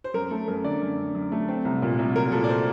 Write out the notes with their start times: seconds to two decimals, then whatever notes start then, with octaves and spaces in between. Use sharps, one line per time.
0.04 C5
0.14 F#2 A#4
0.31 A3 A4
0.48 F#2 A#4
0.64 D3 D5
0.81 F#2
0.98 F#2
1.15 F#2
1.32 A3
1.48 C4
1.65 C2
1.82 A#2
1.99 C2
2.16 F#3 A#4
2.32 A#2 A4
2.44 D5
2.49 C5